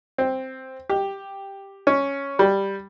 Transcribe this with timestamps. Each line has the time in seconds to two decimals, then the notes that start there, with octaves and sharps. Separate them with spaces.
0.18 C4
0.89 G4
1.87 C#4
2.39 G3